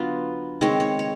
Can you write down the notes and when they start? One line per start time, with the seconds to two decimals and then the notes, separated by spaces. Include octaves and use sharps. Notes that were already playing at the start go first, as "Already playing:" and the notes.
Already playing: D3 F#3 B3 D4 F4
0.61 D#3 G#3 C4 C#5
0.80 C#5
0.99 C#5